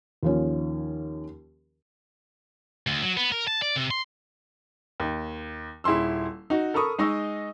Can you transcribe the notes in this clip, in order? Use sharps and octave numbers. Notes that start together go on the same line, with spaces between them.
D#2 F3 C#4
D2
F#3
B3
A#4
A5
D5
C3
C6
D#2
D#1 E4 G#4 C6 E6
D#4 F#4
A4 A#4 B5 C#6 D#6
G#3 D#4 D#5 C#6 E6